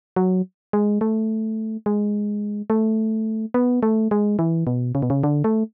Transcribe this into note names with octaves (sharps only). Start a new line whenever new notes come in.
F#3
G#3
A3
G#3
A3
B3
A3
G#3
E3
B2
C#3
B2
C#3
D3
A3